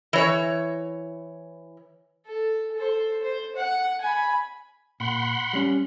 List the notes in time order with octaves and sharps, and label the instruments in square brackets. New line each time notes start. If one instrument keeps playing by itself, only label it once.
[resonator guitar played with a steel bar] E3 C#5
[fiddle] A4
A4 C5
C5
F#5
G#5 B5
[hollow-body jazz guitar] A#2 [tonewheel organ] F#5 B5 C6
[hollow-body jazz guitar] G3 C#4